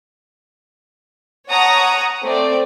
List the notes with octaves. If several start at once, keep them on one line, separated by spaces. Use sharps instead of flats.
C#5 F#5 A5 A#5 D#6
A3 C4 D5